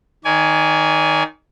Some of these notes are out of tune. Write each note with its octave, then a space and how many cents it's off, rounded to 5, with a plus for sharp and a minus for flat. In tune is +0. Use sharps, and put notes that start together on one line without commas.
D#3 +0 D5 -45 G#5 +0